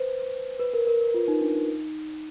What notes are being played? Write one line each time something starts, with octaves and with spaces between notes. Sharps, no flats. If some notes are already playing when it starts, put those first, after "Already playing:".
Already playing: B4 C5
B4
A#4
A#4
A#4
F4
D#4
D4
D#4